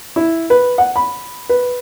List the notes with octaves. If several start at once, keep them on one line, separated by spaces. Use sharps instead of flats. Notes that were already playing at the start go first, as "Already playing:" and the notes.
E4
B4
F#5
B5
B4